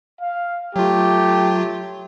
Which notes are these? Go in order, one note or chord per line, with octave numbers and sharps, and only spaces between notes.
F5
F#3 A3 F4 G4